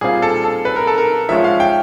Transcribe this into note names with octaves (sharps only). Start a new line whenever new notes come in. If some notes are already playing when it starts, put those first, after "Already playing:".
A#2 G3 C4 F4 G#4
A4
A4
B4
A#4
A4
A#4
F3 G#3 C#4 F4 E5
F5
G5